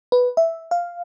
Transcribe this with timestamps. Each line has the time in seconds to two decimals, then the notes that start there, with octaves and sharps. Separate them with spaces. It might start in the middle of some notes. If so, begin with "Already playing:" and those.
0.12 B4
0.37 E5
0.71 F5